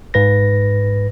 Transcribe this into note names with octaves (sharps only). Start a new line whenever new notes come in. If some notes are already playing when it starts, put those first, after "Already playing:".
G#2 B4 A#6